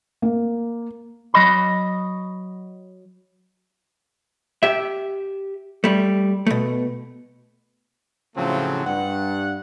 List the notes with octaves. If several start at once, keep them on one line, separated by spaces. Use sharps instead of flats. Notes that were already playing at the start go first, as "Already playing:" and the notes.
A#3
F#3 D#5 B5
G4 E5
G3 A3
B2 A3
A2 C#3 F3 F#3 A3 C4
G2 F#5